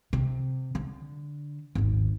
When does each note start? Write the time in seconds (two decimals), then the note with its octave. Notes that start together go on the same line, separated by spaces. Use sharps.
0.13 C3
0.75 D3
1.75 D#1 G#1